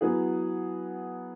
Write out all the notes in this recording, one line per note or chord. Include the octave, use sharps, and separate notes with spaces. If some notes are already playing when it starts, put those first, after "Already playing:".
F#3 B3 E4 G#4